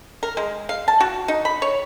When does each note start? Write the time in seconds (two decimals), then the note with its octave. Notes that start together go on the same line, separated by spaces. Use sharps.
0.23 A#4
0.37 G#3
0.69 F5
0.88 A5
1.01 F#4
1.28 D#4
1.45 B5
1.62 C#5